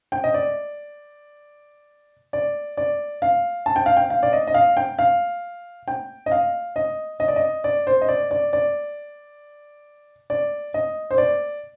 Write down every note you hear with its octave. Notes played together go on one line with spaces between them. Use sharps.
G5
D#5
D5
D5
D5
F5
A5
G5
F5
G5
F5
D5
D#5
D#5
F5
G5
F5
G5
D#5
F5
D#5
D#5
D5
D#5
D5
C5
D#5
D5
D5
D5
D5
D#5
C5
D5